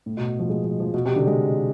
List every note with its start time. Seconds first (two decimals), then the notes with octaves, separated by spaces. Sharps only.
0.06 A2
0.17 B2
0.39 F3
0.50 G#3
0.64 F3
0.80 F3
0.94 B2
1.05 C3
1.16 D3
1.27 G#3